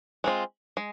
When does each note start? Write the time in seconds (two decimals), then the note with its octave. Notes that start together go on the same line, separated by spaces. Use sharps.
0.24 G#3 C4 F4
0.77 G#3